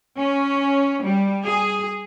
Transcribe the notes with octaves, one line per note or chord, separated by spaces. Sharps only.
C#4
G3
G#4